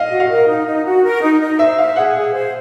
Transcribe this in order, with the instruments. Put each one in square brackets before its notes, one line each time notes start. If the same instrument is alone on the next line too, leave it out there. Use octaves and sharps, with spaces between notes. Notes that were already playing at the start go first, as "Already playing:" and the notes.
Already playing: [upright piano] D#5 F5
[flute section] F#4
[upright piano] F5
[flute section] A#4
D#4
D#4
F#4
A#4
D#4
D#4
[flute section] C5 [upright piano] E5
[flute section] E5 [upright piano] F5
[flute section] G#4 [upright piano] F#5
[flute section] G#4
C5